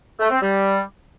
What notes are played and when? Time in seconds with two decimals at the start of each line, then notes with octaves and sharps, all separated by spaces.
0.20 A3
0.31 C4
0.42 G3